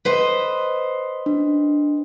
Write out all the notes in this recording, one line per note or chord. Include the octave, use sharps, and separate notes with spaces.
B4 C5 D#5
D4